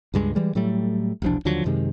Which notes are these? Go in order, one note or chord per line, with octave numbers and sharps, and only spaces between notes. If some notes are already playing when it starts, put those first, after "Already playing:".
C#2 G2 G#3
E3 G3 G#3
A2 F#3 G3 A3
E1 C2 F3 D4
D#2 D3 F3 F#3
F#2 C3 D#3 G#3